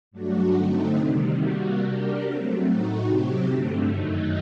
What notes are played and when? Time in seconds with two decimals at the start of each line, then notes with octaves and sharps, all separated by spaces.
0.11 G2 F#3 A3 D4 F#4
0.53 D3 A3 C4 D#4
0.95 C3 D#3 G3
1.37 C3 G3 A#3 F#4
1.79 G3 D4 G4 A#4
2.21 F#3 A3 C4
2.63 A2 A3 D#4 F#4
3.04 C3 F#3 C4 G4
3.46 G2 D3 A3
3.88 F#2 D#3 F#3 A3 D#4